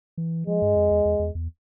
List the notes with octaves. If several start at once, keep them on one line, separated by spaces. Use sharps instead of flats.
E3
F3 G#3
G2
F2
E2
E2
E2
E2